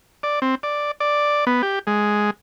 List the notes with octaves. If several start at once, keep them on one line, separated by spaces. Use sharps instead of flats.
D5
C4
D5
D5
B3
G4
G#3